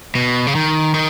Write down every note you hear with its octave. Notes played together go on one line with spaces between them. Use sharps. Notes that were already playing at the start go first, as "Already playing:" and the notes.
B2
C#3
D#3
D#3